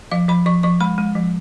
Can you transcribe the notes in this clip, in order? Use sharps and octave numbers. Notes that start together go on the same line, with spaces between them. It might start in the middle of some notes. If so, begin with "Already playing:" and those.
F3 F5
F3 B5
F3 C#6
F3 C#6
G#3 B5
G#3
F3